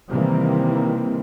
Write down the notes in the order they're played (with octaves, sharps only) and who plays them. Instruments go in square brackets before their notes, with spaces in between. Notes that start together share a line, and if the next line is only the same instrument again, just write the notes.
[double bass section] C3 D#3 E3 G3 A#3 C4